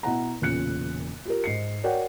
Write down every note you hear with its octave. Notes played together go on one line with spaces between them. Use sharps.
B2 E4 F#5 A#5
E1 A#2 C#3 F#6 C#7
F4 G4 A#4
G#2 C7 C#7
F#4 A#4 C#5 D5 F#5 G5